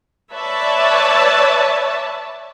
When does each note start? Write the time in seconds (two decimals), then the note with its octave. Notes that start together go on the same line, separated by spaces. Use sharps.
0.34 B4 C#5 D5 E5 A5